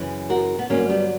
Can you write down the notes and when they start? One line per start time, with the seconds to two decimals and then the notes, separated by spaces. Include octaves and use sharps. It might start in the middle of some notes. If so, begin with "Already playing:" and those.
Already playing: F#2 C#3 E3
0.30 F#4 A#4
0.59 B3
0.70 G2 D3 F#3 A#3 C#4
0.89 G3 B3